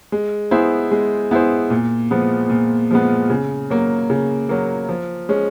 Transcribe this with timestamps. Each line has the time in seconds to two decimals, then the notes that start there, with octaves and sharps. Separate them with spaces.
0.12 G#3
0.51 B3 E4 G#4 C5
0.91 G#3
1.31 B3 E4 G#4 C5
1.70 A#2
2.10 F3 G#3 B3
2.50 A#2
2.91 F3 G#3 B3
3.30 C#3
3.70 F#3 A#3
4.10 C#3
4.49 F#3 A#3
4.89 F3
5.29 G#3 C#4